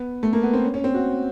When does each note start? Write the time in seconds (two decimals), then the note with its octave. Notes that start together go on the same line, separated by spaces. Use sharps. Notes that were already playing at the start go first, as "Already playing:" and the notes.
Already playing: B3
0.23 A3
0.33 A#3
0.43 B3
0.53 C4
0.64 C#4
0.74 C#4
0.84 C4
0.94 F#4